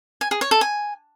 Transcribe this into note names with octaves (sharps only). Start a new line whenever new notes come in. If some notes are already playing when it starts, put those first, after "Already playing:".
G#5
G#4
C#5
A4
G#5